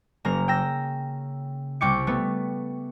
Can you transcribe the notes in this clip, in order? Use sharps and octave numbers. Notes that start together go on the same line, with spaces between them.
F#1 C#3 A#3 A#5
G5 E6 A#6
C2 C3 G5 C#6 D6 C#7
A3 B3